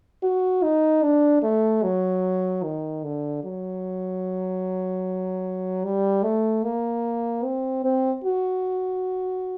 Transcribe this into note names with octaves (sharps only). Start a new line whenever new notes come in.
F#4
D#4
D4
A3
F#3
D#3
D3
F#3
G3
A3
A#3
C4
C4
F#4